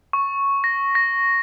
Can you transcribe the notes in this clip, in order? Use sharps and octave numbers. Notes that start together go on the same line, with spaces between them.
C#6
A#6
A#6